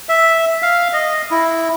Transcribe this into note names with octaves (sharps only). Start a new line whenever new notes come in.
E5
F5
D#5
E4